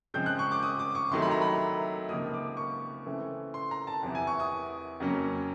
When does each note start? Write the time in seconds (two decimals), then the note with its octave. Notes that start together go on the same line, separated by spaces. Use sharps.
0.14 C#3 F3 G#3 C4 G6
0.26 F#6
0.39 C#6
0.51 D6
0.63 D#6
0.79 D6
0.95 C#6
1.11 C2 C3 D#3 F#3 A3 C6
1.22 B5
1.31 A#5
1.42 B5
2.09 C#2 C3 F3 A#3 D#4 D#6
2.34 D6
2.57 C#6
3.06 C#3 E3 A3 C4
3.54 C6
3.71 A#5
3.87 A5
4.03 E2 C3 E3
4.15 G#5
4.27 C#6
4.40 D#6
5.00 F2 C#3 F#3 A#3 C#4